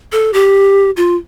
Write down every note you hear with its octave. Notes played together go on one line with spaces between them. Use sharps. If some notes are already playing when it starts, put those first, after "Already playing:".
A4
G4
F4